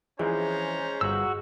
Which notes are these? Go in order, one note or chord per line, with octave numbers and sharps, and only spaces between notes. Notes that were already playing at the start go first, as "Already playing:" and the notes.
E3 F3 G#3 C4 C#4 C5 A#5
G1 F#4 E6